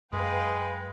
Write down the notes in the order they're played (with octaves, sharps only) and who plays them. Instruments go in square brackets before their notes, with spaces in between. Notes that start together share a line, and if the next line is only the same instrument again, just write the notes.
[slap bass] F#2 [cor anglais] G#3 [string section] B4 F5 G5